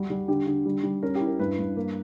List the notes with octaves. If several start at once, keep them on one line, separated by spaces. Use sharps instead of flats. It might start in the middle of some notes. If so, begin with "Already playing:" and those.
Already playing: G3 F#4
G3
D3 G4
D3
G3
G3
C#4 A#4
G4
E4
A#4
G2 B4
G2
A#3